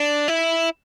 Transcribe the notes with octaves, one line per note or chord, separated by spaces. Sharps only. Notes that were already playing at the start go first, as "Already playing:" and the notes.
Already playing: D4
E4